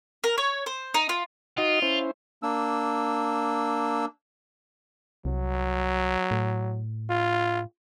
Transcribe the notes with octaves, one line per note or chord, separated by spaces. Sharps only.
A#4
C#5
C5
D#4
F4
D#4 F4 F#4 D#5
C#4 E4 C5
A#3 D4 E6
C2 F#3
A2
F4